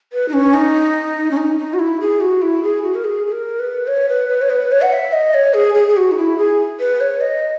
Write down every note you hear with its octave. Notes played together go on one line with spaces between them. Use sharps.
B4
D#4
C#4
D#4
C#4
D#4
D#4
F#4
E4
G#4
F#4
E4
G#4
F#4
A#4
G#4
G#4
A#4
B4
C#5
B4
B4
C#5
B4
C#5
F#5
E5
D#5
C#5
G#4
G#4
G#4
F#4
D#4
E4
G#4
B4
C#5
D#5